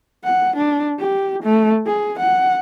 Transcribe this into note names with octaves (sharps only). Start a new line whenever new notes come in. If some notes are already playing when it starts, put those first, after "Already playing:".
F#5
D4
G4
A3
G#4
F#5